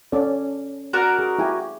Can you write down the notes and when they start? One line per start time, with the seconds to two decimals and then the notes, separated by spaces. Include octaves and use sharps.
0.12 C#4 A4 D5
0.93 F#4 A#4 D5
1.19 G#4
1.39 E4 G4 G#5